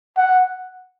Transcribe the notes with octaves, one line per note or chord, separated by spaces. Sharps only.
F#5